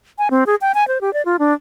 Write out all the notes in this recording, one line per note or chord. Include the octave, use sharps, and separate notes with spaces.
G#5
C4
G#4
G5
G#5
C5
G4
D5
F4
D4